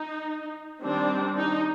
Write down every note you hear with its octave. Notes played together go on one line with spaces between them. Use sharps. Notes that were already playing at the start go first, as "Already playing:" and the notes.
Already playing: D#4
D#3 G3 C4 D4
D#4